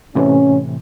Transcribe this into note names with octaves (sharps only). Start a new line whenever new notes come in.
A2 C3 E3 C#4